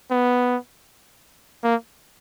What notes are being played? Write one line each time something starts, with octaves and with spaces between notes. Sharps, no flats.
B3
A#3